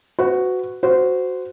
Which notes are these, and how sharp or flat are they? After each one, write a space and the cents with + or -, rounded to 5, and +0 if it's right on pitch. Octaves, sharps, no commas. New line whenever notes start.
F#4 +0 B4 +40
F#4 +0 C5 -20